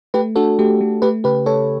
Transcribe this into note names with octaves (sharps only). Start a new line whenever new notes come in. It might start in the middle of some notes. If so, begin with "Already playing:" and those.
A3 G4 B4
D4 F#4 A4
A3 G4
A3
A3 G4 B4
C#3 G4 B4
A3 A4 C#5